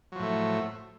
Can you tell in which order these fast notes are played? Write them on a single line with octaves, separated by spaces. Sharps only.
F#3 F3 A2 A3